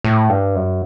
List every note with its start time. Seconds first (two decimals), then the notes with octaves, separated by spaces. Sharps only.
0.04 A2
0.29 G2
0.55 F#2